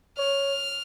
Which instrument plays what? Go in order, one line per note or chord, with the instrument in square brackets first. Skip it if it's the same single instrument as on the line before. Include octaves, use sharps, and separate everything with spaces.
[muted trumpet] C#5 [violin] F6